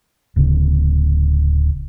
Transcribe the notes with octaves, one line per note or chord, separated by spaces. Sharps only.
D1 C#3